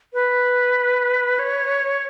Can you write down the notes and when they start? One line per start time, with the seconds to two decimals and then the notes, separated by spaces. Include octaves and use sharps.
0.13 B4
1.39 C#5